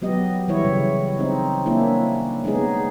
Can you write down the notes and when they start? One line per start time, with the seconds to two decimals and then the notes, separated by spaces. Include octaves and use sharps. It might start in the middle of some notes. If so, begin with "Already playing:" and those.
0.02 F#3 B3 G4 D#5
0.48 E3 G3 E4 C#5
0.65 C#3
1.19 C4 D#4
1.66 A#3 C#4 D4 E4
2.44 G#3 B3 C#4 D#4 G#4